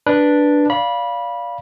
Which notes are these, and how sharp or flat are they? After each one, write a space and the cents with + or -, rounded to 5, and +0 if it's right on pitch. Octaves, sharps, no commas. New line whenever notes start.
D4 +0 B4 -10
D5 -20 F5 +0 B5 -20